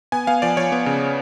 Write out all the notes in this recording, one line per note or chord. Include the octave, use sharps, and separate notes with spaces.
B3 G#5
B3 F5
F3 D5
F3 C#5
B3
C#3